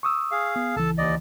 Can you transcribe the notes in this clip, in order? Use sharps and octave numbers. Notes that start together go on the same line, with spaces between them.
C#6 D#6 E6
G#4 F5
B3
C#2 E3 A4 A5
D#2 D5 D#5